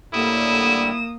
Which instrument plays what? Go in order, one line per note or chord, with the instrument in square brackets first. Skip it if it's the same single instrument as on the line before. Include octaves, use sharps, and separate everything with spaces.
[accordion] A2 D3 G3 [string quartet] A#3 [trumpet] E4 [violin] D#6 E7